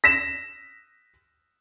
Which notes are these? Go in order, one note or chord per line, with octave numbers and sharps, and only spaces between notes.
A#6 B6 E7